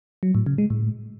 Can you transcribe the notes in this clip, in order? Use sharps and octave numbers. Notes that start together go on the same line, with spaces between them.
F#3
A2
C#3
G#3
A2